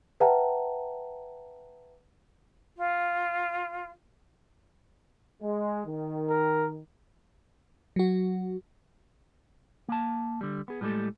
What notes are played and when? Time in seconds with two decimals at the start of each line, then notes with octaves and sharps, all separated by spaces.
0.20 B4 E5 F#5 G5 A5 A#5
2.77 F4
5.43 G#3
5.87 D#3
6.29 A#4
7.96 F#3 F#4
9.88 A#3 A5
10.41 D3 G3
10.68 B3 G#4
10.81 A2 G3 G#3 G4 A4